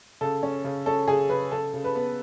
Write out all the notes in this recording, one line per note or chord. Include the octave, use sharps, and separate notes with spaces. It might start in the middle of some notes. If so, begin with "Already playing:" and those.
C#3 A4
C#4
C#3
C#4 A4
C#3 G#4
C#3 B4
C#3 A4
C#3
B4
B3